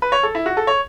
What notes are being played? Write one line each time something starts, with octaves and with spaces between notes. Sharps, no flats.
B4
C#5
A4
E4
F#4
A4
C#5